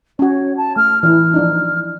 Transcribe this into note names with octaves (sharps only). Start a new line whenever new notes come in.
C#4 F#4 C#5
A5
A3 F6
E3 E4 F6
F3 D4 D#4